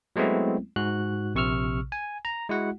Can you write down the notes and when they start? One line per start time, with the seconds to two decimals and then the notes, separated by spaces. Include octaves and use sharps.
0.16 F#3 G#3 A3 B3 C4 E4
0.76 G#2 F#4 F#6
1.35 A#1 C3 C#6 E6 F6
1.92 G#5
2.25 A#5
2.49 G#3 E4 F#4 F#5